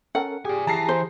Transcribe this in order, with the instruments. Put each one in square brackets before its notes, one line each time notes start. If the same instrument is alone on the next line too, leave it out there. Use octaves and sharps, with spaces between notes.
[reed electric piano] C#4 A4 A#4 [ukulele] F#5
[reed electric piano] G4 G#4 D#6 [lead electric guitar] D5 G#5
[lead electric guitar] E3 [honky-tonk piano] A5 A#5 C7
[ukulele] C5